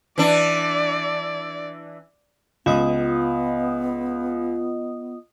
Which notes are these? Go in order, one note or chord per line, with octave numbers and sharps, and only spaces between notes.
E3 D4 D5
C#2 B3 F4 D#5 D#6